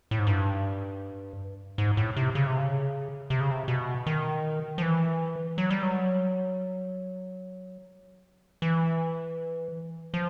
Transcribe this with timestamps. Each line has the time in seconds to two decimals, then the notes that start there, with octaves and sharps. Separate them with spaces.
0.11 A2
0.19 G#2
0.27 G2
1.78 G#2
1.97 A2
2.17 C3
2.35 C#3
2.47 C3
2.58 C#3
3.30 C3
3.40 C#3
3.51 C3
3.68 B2
4.07 D#3
4.78 F3
4.83 E3
5.58 F#3
5.70 G3
5.83 F#3
8.62 E3
10.14 F3